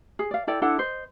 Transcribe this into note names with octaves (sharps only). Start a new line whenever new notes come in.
G#4
D5 F5
E4 A4 D5 G5
D4 E4 A4 F#5
C5 D#5